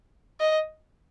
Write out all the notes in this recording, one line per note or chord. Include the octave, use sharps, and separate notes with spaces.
D#5